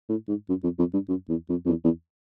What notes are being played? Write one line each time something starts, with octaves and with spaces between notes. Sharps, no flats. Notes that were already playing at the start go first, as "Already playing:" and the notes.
A2
G#2
F#2
F2
F2
G2
F#2
E2
F2
F2
E2
E2